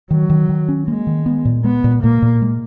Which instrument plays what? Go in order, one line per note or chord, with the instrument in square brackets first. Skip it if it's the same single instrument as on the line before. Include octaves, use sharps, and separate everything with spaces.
[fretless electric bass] D#3 [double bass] F#3
[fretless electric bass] D#3
D#3
C#4
[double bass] G#3 [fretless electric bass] A#3
[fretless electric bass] D#3
B3
A#2
[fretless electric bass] G#3 [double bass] B3
[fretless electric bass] A#2
[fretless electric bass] A#2 [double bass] A#3
[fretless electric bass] A#2
G#3